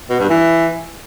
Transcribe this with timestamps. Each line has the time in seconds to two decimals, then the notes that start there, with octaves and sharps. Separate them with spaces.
0.10 B2
0.20 G2
0.29 E3